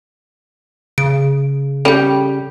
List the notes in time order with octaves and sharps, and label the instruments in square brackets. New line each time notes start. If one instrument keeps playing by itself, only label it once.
[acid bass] C#3 [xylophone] D7
[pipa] G3 [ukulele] C#4 G4 [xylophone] A4 G5